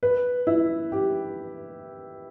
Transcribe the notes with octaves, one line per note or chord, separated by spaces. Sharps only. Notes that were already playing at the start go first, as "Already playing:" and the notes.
B4
E4
G4